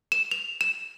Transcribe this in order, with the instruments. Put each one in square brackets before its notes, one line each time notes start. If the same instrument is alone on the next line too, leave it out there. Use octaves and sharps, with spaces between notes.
[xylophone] E7
F7
E7